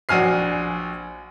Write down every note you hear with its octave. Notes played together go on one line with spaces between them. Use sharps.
A#1 F#4 G#5 F6 C7